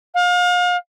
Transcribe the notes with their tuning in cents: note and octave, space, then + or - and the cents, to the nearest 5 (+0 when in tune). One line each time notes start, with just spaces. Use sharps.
F5 +35